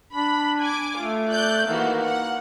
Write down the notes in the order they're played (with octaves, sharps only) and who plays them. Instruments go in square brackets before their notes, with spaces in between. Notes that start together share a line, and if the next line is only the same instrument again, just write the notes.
[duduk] D4 [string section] B5
[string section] G#5 D6
[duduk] A3 [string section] F4
[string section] D5 F#6 G6
[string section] D#3 E3 F#4 [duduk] A#3
[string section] F#5